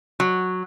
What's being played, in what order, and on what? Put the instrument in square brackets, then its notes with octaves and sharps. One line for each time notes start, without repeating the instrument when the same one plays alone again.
[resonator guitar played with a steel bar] F#3